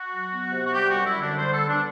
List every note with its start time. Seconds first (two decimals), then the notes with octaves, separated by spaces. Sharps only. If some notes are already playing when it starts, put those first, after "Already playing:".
Already playing: F#4
0.10 F#3
0.31 B3
0.52 C3
0.65 F#4
0.73 G3 G4
0.89 F#4
0.94 F#2
1.05 E4
1.15 D3
1.21 D4
1.36 G3 C5
1.53 A4
1.58 B3
1.68 D4